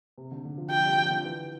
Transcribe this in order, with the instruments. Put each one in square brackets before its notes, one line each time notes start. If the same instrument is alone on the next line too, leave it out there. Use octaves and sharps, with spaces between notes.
[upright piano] C3
D3
D3
F3
[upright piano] F3 [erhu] G5
[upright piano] G3
F3
D3
E3